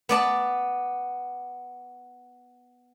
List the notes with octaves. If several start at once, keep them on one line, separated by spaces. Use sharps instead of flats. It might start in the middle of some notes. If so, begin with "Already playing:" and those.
B3 D5 A5